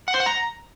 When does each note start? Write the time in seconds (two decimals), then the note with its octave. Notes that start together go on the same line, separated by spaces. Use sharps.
0.08 F#5
0.14 C5
0.20 F#5
0.26 A#5